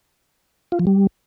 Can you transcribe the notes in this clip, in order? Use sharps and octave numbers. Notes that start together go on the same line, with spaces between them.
F4
F3
G3